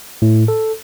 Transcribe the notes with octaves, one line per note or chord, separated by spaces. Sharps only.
A2
A4